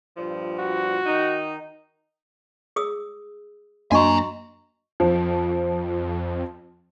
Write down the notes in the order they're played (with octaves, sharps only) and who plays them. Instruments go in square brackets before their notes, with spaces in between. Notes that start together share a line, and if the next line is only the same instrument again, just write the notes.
[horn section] G2 A#2 F3
[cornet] F#4
[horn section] D#3 D#4
[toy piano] G#4 D#6 E6
[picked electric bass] F#2 A#3 D4 [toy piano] F#4 D#5 C#6 [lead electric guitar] G#5 A#5
[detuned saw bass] F2 [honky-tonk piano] F3